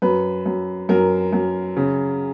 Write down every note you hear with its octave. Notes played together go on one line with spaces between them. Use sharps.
F#2 B4
F#2
F#2 A#4
F#2
C#3